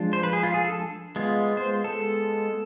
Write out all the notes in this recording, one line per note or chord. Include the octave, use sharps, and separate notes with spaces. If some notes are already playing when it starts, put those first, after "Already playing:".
Already playing: F3 G#3 D4 F4
C5
B4
G#4
F4
G#4
A4
G#3 B3 F4
C5
A4